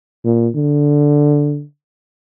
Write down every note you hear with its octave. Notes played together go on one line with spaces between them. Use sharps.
A#2
D3